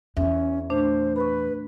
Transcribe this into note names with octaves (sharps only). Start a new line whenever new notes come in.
E2 C#4 E5
A#2 A3 D4 C5
B4 B5 C#6